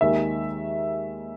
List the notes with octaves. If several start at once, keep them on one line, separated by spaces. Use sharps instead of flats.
D#2 D#3 G#3 E5